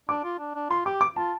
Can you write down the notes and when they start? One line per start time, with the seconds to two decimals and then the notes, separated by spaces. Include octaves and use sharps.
0.09 D4 D6
0.24 F4
0.39 D4
0.55 D4
0.70 F4 C6
0.86 G4 D6
1.01 D6
1.16 F4 A5